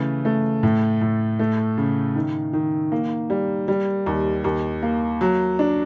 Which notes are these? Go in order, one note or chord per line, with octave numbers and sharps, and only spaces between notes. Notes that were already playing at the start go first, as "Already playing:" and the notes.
Already playing: C#3 E3 A3
A3
A2
A2
A3
C#3
D#3
D#3
A#3
G3
G3
D#2
D#2
A#3
F#3
D4